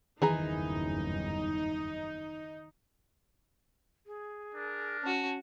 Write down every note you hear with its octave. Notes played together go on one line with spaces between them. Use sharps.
F#1 E2 G2 D#3 E3 D#4 G#4 A#5
G#4
D4 A#4
C#4 F#4 A5